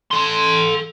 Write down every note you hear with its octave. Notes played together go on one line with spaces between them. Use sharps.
A4 C6